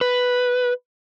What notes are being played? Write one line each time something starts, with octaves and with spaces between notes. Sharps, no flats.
B4